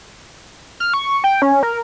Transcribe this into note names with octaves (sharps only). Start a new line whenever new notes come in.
F6
C#6
G5
C#4
A#4